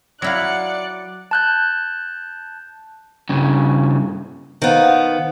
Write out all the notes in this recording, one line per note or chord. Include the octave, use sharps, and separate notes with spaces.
F#3 E4 D5 F5 F#6 C#7
A5 F#6 G6
G2 C#3
D#3 B3 C5 F5 F#5